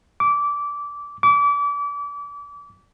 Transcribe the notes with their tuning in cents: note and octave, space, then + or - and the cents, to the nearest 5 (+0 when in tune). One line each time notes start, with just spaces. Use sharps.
D6 -15
D6 -30